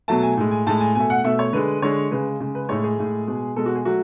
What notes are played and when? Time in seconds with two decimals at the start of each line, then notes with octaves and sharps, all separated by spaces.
0.08 B2 F#3 A3 A5
0.23 G#5
0.37 A2 G#3
0.51 G#5
0.67 A2 G#3 A5
0.80 G#5
0.95 B2 A3 G#5
1.10 F#5
1.24 B2 A3 E5
1.39 C#5
1.53 D3 G#3 B4
1.82 D3 G#3 C#5
2.11 C#3 G#3 B4
2.40 C#3 G#3
2.55 B4
2.69 A2 G#3 C#5
2.84 G#4
2.98 A2 G#3
3.27 B2 G#3
3.56 B2 G#3 A4
3.66 F#4
3.75 G#4
3.85 F#3 A3 F#4